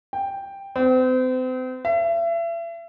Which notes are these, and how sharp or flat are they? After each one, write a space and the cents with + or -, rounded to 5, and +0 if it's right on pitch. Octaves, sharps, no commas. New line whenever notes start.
G5 +5
C4 -35
E5 +35